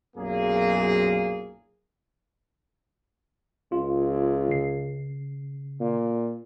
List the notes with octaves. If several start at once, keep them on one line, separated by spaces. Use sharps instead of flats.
B1 F#2 A#2 A#3 G#4
C#2 F4
C#3 C7
A#2